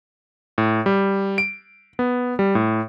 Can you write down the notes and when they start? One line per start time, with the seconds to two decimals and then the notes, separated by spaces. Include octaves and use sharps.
0.58 A2
0.86 G3
1.38 D7
1.99 B3
2.39 G3
2.55 A2